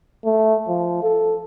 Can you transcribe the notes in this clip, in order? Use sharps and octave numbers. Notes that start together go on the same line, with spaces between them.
A3
F3
A4